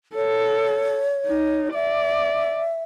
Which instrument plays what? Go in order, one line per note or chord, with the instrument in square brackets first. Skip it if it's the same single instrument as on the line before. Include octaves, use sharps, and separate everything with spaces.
[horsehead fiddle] A4 [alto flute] C#5
[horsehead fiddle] D#4
[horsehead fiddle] D5 [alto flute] E5